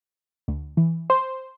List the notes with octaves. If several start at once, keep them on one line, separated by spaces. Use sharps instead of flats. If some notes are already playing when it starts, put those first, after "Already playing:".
D2
E3
C5